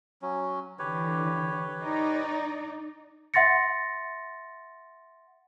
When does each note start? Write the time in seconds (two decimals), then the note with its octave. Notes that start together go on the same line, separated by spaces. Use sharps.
0.22 F#3 C#4
0.79 D3 E3 G4 B4 C#5
1.82 D#4 D5
3.34 E5 F#5 C6 A6 A#6 C#7